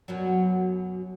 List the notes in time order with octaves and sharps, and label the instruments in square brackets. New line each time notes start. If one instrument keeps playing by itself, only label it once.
[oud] F#2 B2 F#3